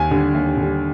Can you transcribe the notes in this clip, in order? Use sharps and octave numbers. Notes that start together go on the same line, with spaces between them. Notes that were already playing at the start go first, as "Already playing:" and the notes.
Already playing: D#2 G#5
D3 G3
D#2
D3 G3